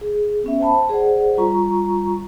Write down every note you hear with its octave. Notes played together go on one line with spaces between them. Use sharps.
G#4
B3 C#4 E5
C5 G5 A5 B5
G#4 C5 D5 F#5
G3 F4 A#5 C#6